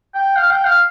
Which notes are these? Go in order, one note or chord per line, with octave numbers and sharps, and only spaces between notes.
G5
F5
G5
F5